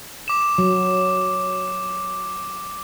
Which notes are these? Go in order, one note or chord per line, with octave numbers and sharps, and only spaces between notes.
D6 E7
F#3